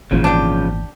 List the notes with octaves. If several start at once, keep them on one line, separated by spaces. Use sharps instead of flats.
G#1 E2 A#2 C#3 F3
D4 G4